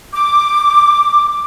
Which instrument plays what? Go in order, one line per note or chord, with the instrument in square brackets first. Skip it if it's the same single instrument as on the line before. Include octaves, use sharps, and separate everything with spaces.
[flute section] D6